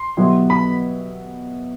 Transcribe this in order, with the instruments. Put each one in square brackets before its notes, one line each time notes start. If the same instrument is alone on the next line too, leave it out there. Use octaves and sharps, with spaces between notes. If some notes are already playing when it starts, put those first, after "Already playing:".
Already playing: [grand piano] C6
[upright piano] B2 F#3 B3 E4 G4
[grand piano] B5